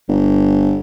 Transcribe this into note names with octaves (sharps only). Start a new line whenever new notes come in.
G1